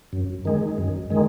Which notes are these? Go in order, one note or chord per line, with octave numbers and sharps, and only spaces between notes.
F#2
D#3 G#3
F#2
D#3 G#3